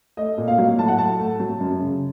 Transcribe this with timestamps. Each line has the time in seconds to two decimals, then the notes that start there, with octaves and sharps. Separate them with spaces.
0.17 A3 D#5
0.38 A#2
0.48 F5
0.58 F#3
0.78 A2 A5
0.88 F#5
0.98 A2 A5
1.19 A3
1.39 F#3
1.60 F#2
1.80 C#3